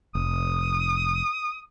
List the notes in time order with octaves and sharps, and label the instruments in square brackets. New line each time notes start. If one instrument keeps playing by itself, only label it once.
[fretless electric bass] F1 [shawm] D#6